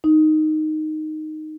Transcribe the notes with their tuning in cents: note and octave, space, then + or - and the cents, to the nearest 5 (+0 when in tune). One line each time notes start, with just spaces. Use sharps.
D#4 -5